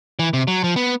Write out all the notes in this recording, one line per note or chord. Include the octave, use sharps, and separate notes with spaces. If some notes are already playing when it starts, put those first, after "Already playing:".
E3
C3
F#3
F3
B3